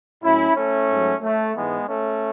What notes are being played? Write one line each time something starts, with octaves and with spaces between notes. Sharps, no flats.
A2 F#3 C#4 E4
A3 C#4
G#2 F#3
A3
G#2 E3 G#3 B3
A3 C#4